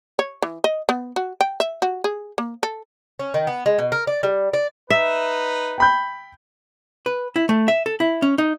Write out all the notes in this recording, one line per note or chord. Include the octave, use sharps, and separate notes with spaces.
C#5
E3
D#5
B3
F#4
G5
E5
F#4
G#4
A#3
A4
C#4
D#3
B3
G#3
B2
A#4
D5
G3
D5
D#4 B4 E5
G5 B5 G6
B4
E4
A3
E5
A4
E4
C#4
D#4